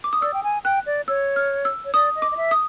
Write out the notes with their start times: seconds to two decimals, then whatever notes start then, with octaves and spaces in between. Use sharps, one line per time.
0.04 D6
0.13 D#6
0.22 D5 E6
0.34 G5
0.43 G#5
0.64 G5 F#6
0.86 D5
1.08 C#5 E6
1.36 F6
1.65 E6
1.85 C#5
1.94 D5 D#6
2.16 D#5
2.22 D6
2.32 D#5
2.37 E5
2.51 D#6